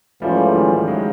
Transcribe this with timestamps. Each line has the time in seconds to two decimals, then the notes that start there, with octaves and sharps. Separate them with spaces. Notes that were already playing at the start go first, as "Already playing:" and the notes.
0.21 G#2 E3 F3 G3 A3 C#4 F4
0.55 D#3 F3
0.87 F#3 G#3